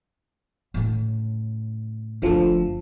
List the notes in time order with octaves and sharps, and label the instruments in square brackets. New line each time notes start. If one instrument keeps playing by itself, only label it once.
[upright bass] A2 C#3
[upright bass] F#1 A3 [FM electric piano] D3 F3 A4